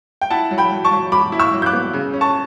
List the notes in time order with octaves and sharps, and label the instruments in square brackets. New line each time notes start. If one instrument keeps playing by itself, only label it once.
[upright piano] G5
E4 F#5 A5
F#3
G5 B5
F#3
A5 C#6
F#3
F#3 B5 D6
E4
C#6 E6
F#3
G6
D6 F#6
B3
C#3
C#4
A5 C#6